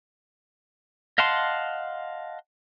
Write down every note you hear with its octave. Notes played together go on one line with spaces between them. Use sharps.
D#5 F5 F#5 A5 C6